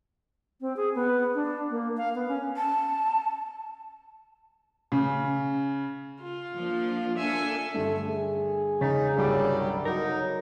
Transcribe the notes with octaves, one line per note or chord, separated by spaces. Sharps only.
C4
G#4
B3
D4
A#3
F5
B3
C#4
A5
C#3
F4
F3 A#3 D4
A#3 D4 A4 E5 G#5
G2 D3 A3
G#4
E1 C#3 D#4 A6 B6
G1 C2 F#3 G3 D6
B1 F#3 D#4 A#4